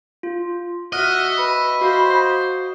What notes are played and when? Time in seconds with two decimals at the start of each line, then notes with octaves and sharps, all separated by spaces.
0.23 F4
0.93 F#4 D#5 E5 F#5 F6
1.39 B4 B5
1.81 F#4 C5 F5